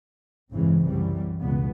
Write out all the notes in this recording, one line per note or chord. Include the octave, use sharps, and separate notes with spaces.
G1 E2 C#3 E3 G#3 C4
C2 F#2 E3 G3
C#2 F#2 B2 B3